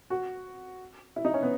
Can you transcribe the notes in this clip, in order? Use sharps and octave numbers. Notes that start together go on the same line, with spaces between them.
F#4
E4
D#4
C#4
B3